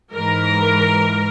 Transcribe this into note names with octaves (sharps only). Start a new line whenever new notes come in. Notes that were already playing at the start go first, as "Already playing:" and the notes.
G#2 E3 A#4